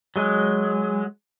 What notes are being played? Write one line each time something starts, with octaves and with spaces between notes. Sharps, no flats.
F#3 G#3